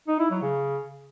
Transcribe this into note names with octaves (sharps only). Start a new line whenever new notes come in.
D#4
E4
F#3
C#3